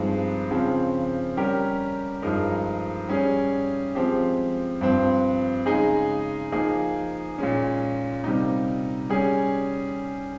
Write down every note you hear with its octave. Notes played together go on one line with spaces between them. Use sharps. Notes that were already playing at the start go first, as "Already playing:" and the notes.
Already playing: G2 F3 G#3 C4 D#4
C#3 F3 C4
G3 C#4 G4 A#4
G2 F3 G#3 D#4 A#4
G3 C#4 G#4
F3 G#3 C4 G4
G2 F3 C4
C#3 G#3 D#4 G#4
F3 A#3 D#4 G#4
A#2 G#3 C#4
C3 G3 A#3 D#4
G3 C#4 G#4